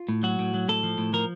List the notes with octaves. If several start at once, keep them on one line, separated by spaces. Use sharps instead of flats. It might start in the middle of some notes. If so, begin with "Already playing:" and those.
Already playing: F4
A2
F#3 F#4
A2
F#3
A2 A4
F3
A2
F3 A#4